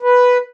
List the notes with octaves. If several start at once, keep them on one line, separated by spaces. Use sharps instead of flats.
B4